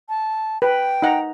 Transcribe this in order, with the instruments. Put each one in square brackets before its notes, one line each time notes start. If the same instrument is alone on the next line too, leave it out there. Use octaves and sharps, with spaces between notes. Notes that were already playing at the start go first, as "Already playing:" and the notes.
[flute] A5
[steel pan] B4 [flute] G5
[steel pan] D#4 F#5 A#5